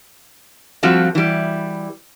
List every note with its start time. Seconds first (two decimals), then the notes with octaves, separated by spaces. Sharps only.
0.83 F3 G3 C4 F4 F#4 A4
1.15 E3 G3